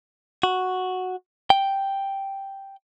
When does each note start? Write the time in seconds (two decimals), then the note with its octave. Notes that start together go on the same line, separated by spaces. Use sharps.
0.43 F#4
1.50 G5